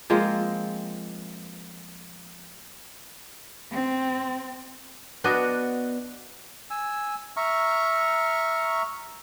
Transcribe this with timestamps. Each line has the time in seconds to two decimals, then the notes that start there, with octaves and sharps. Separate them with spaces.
0.10 F3 G#3 A#3 C4
3.72 C4
5.24 B3 D4 F#4 D#5
6.70 G#5 E6
7.37 E5 A#5 C#6 F6